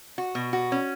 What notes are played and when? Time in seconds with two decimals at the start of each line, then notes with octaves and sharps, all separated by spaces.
0.18 F#4
0.35 B2
0.53 F#4
0.72 C#4